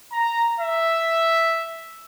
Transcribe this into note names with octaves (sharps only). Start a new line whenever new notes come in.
A#5
E5